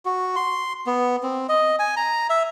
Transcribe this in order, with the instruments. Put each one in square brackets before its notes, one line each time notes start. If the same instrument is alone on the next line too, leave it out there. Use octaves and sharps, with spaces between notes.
[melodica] F#4
C6
B3
C4
D#5
G#5
A#5
E5